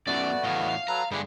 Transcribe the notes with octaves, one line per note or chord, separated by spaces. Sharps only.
F#2 B2 A3 B3 F#4 D5
E2 A2 D#5 F5
F5
F#3 A4 B4 A#5
G2 D3 G#3 E4 G4 B4